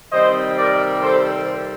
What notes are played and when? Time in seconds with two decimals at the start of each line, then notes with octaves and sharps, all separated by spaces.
0.12 C3 D#3 G3 C4 C5 D#5
0.57 A#4 D5
1.03 A4 C5